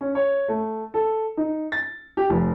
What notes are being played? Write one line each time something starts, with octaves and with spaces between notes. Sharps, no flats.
C#4
C#5
A3
A4
D#4
A6
G4
F1